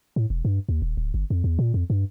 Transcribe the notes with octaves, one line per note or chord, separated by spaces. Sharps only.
A2
E1
G2
D#2
D#1
D1
G1
F2
E2
A#2
F2
G2